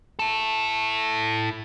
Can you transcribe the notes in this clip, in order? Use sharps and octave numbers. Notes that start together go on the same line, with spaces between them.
E4 A4